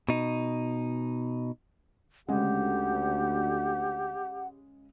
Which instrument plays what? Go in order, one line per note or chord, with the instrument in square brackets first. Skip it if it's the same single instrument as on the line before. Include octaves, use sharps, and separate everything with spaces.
[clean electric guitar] B2 D#4
[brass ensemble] D2 [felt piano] C#3 G#3 [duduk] G4 [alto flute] F#5